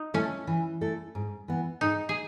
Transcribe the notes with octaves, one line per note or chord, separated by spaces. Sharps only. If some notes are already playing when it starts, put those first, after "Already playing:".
Already playing: D#4
A3 C#4 E4 A4
E3
A3 E4 A4
G#2
E3 B3
G#2 D#4
G#4